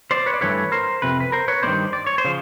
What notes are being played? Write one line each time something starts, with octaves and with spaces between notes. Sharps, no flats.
C5 D5
B4 C#5
D5
G2 E3 A3 B4 C#5
A#4 C5
F2 C3 B4
B4
A#4 C5
B4 C#5
G2 D#3 G3 A#3 D4 C5 D5
D5
C#5
C5
C#3 F3